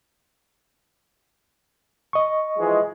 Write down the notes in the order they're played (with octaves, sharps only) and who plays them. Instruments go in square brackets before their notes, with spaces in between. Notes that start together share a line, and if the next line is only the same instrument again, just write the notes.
[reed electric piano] D#5 C#6
[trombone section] E3 F3 G#3